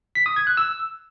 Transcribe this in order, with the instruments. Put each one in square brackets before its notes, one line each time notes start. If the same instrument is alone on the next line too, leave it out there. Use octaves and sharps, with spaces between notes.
[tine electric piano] B6
D#6
G#6
F#6
E6